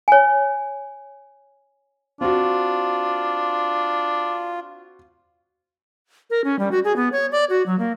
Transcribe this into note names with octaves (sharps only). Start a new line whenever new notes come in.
C#5 G#5
C4 D4 F4 F#4
A#4
C#4
G3
F#4
G#4
B3
C#5
D5
F#4
F#3
A#3